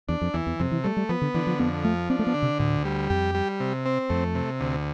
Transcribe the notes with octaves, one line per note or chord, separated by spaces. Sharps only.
E2 D4
F2
E2 E3
E2
F2 C3
E3
G3 A3
G3
F3 B3
D3
D3 E3
F3
F2 B3
F3 A3
C4 D4
A3
B3
D3
C3
D2 A2
G3
F2 G4
G3
C3
C4
F2 A3
C3
D2